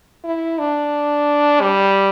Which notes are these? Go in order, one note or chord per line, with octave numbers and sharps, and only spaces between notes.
E4
D4
G3